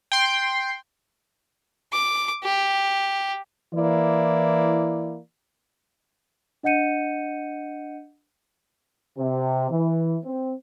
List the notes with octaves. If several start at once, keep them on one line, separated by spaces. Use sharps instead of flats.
G5 C6
D6
G4
E3 A#3 E4 D5
D4 D#5 F#5 G6 C#7 D#7
C3
E3
C4